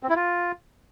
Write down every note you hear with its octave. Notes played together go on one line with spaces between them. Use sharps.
C4
E4
F4